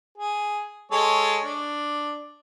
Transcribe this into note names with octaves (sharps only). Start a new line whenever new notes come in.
G#4
G#3 A4 C#5
D4